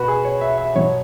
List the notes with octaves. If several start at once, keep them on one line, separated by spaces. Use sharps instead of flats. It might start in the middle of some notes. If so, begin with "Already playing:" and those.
Already playing: B2 B3 F#4 B4
G#4
C#5
E5
E5
B2 F#3 B3 C#5